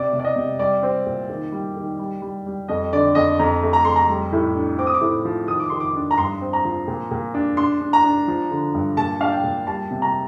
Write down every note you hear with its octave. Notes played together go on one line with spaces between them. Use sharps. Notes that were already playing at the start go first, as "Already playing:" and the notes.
Already playing: C3 D5
C3
D5
D#5
C3
G3 D5
C4
A#2
D#3
G3
D#3
G3
G3
G3
F2 D#5
D3 D5
F2 D#5
F2 A#5
A3
A#5
F2 C6
A#5
G3
A2
D4
C4 D6
D#6
D6
A2
F3
D#3 D#6
D6
D#3 C6
D6
D4
A#5
G2 C6
C4
A#5
F3
A#2
A#2
D4
D4 C6
D4
A#5
D4
F3
D3
G2
A#2 A5
D4 F5
G5
A#2
G3 A5
C3
A#5